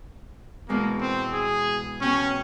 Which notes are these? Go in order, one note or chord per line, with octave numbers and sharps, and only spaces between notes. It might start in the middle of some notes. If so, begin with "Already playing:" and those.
E2 B2 G#3 A#3
C4
G#4
B2 C#4 G5 C#6